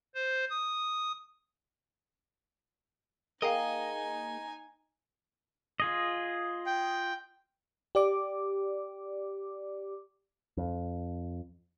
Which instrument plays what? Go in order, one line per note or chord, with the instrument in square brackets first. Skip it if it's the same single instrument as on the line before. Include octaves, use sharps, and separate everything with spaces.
[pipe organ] C5
D#6
[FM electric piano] A#3 G#4 [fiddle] D#4 G#5 [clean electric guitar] D#5 [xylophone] F5 G5 A#5
[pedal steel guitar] F4 G#4 D#5
[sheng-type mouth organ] G5
[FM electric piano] G4 D5 D6
[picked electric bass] F2